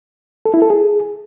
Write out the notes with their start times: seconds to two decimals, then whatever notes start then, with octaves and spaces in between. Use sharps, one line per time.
0.46 A4
0.54 E4
0.62 A4
0.70 G#4